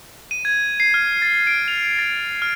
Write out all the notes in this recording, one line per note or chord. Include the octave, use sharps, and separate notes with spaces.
D#7
G#6
C7
F6
A6
D7
F7
A6
F6